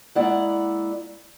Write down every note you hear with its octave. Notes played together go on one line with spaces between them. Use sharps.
G#3 A#3 E4 D5 F#5